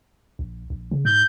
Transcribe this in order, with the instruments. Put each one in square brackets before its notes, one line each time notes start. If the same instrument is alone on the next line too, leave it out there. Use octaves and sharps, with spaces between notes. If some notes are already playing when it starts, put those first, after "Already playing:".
[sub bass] A#1
A#1
C#3
[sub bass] G#2 [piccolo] G6